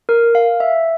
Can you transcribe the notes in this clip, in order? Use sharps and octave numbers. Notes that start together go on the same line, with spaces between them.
A#4
F5
E5